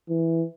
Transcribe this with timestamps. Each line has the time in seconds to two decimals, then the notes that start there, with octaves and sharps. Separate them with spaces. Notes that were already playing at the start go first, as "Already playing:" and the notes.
0.10 E3